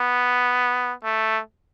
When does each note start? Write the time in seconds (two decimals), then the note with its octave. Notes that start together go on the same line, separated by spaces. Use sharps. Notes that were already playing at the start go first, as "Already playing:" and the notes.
Already playing: B3
1.04 A3